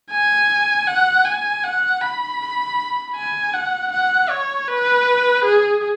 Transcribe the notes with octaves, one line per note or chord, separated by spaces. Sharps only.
G#5
F#5
G#5
F#5
B5
G#5
F#5
F#5
C#5
B4
G#4